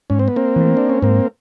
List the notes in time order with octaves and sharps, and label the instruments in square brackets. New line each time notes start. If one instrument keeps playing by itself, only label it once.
[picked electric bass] G#2 [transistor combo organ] C#4
[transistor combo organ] C4
B3
A#3 C4
[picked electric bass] E3 A3
[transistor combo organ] D4
C#4
[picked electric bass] G#2 [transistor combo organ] A#3 C4